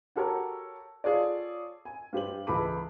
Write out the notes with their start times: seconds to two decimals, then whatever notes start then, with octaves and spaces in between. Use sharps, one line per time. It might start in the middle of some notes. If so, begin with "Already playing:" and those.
0.16 F#4 G4 A4 A#4 C#5
1.04 F4 G#4 A4 C#5 D5
1.85 G#5
2.13 G2 G4 C5 F#7
2.47 C#2 E3 A4 B5 D6